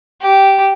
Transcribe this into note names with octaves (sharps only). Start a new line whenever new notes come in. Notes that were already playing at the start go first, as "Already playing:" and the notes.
G4